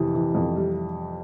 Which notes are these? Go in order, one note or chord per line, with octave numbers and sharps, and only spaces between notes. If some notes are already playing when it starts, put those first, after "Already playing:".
Already playing: F2 C3 E3
E3
F2
G3